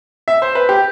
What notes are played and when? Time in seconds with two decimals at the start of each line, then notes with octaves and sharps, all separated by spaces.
0.28 E5
0.42 C5
0.55 B4
0.69 G4